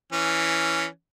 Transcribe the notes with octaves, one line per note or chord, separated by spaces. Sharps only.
E3 C#4